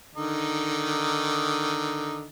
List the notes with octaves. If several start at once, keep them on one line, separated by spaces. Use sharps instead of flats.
D3 D#3 D#4